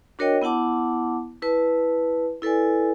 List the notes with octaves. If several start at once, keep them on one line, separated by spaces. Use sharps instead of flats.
D4 F#4 A#4 C#5 D#5 G5
B3 E4 F#5 A5 D6
E4 B4 A5
E4 A4 B4 D5 G#5